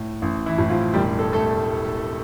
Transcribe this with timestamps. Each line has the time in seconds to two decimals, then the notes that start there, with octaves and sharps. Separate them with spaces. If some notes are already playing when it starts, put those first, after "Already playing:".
Already playing: A2
0.22 A1
0.46 E3 E4
0.58 A2
0.70 F3 F4
0.94 E1 G3 G4
1.19 A4
1.32 A3 A4